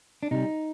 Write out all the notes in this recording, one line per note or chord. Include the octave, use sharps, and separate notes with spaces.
D4
C3 G3 D#4